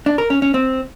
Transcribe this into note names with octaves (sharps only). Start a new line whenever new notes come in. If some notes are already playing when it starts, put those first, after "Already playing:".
D4
A#4
C#4
C#4
C4